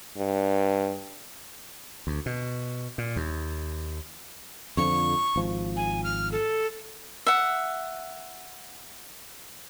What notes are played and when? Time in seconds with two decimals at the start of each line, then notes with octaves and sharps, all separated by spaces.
0.18 G2
2.07 D2
2.26 B2
2.98 A#2
3.16 D#2
4.77 F2 D3 F3 C#6
5.36 G#1 F3
5.77 G#5
6.04 F6
6.32 A4
7.26 E5 F#5